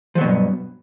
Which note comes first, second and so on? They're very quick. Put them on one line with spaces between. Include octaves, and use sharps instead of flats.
F3 F#3 B2 G2